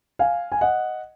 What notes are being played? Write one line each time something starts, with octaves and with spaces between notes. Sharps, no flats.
F5 G#5
G#5
D#5 F#5